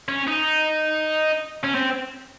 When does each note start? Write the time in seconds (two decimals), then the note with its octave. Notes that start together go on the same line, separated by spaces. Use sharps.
0.08 C#4
0.27 D#4
1.64 C#4
1.75 C4